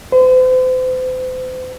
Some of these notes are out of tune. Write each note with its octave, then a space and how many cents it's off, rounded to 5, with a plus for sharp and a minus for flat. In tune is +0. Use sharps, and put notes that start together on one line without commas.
C5 -40